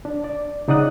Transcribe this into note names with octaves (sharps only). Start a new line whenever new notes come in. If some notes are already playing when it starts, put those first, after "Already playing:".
D4
D5
C#3 D#4 D5 F#5 D#6 F#6